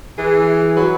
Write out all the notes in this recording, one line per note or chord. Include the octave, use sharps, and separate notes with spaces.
E3 G#4
F#3 B4